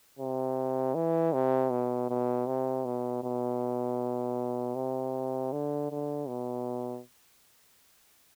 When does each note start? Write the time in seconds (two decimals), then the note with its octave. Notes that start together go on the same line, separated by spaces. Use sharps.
0.19 C3
0.95 E3
1.33 C3
1.70 B2
2.10 B2
2.47 C3
2.85 B2
3.23 B2
4.75 C3
5.52 D3
5.90 D3
6.28 B2